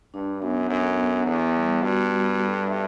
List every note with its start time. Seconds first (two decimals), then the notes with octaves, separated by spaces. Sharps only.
0.14 G2 D4
0.42 F#2 B3
0.69 F#2 A4
0.98 B3
1.26 E2 B3
1.55 G3
1.83 G2 F#4
2.11 G3
2.38 A4
2.67 E5